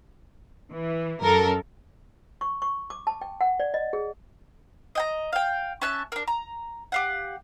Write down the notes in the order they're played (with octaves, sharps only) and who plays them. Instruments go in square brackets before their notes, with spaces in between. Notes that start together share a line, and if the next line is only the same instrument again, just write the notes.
[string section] E3
F#2 A4 A#4
[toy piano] C#6
C#6
D6
A5
G5
F#5
D5
D#5
G#4
[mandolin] D#5 G5 A#5
F5 G5
C#4 E5 A5 F#6
D4 A#4
A#5
G4 F5 F#5